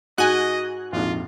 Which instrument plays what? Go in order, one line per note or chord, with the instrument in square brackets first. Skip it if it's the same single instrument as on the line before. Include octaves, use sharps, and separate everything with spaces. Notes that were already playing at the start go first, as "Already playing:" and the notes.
[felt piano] G#2 G#3 D#7 [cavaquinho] F#4 [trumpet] D#5 [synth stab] G#5 F#6
[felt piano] A#1 F2 G#2 [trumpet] F4